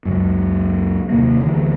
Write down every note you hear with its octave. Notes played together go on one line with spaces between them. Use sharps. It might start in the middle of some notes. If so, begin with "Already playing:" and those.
C#2 F#2
D#2 C3 A#3
D2 E3